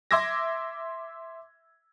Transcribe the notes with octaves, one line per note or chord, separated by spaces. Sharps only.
E5 C6 D6 E6 G#6 A#6